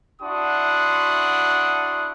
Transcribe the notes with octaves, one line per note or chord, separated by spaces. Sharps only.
D4 E4 F#4 F#5 C6 D#6